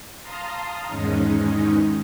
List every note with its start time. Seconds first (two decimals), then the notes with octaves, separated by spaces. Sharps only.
0.22 F5 A5 A#5 C6 D#6
0.87 E2 G#2 D#3 G#3 C#4 D#4